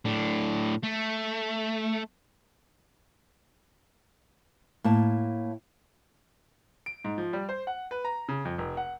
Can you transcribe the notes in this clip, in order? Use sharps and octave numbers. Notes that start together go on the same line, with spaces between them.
A2 D4
A3
A2 A#3 A5
D7
G#2
F3
G3
C5
F#5
B4
A#5
C#3
F2
F1
F#5